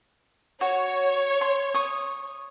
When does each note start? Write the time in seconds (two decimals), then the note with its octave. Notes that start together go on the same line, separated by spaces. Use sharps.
0.61 F#4 C#5
1.41 C6
1.74 C#6 D#6